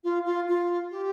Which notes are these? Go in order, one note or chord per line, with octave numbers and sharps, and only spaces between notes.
F4
F4
F4
G4